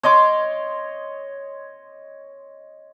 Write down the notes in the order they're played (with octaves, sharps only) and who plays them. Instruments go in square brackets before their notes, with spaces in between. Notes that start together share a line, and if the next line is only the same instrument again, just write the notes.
[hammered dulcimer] C#5 D#5 C6 D6